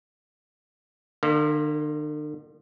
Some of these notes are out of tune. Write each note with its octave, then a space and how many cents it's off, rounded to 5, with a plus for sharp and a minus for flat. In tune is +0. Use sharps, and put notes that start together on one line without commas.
D3 +45 A#3 +0